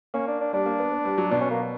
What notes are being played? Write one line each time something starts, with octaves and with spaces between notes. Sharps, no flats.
A#3 C#4
D4
D4
G3 D4
A#3
B3
B3
G3
F#3
B2 D4
C#4
A#3